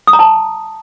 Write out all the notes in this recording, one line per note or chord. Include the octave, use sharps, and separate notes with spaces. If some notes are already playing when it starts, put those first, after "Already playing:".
D#6
A#5
A5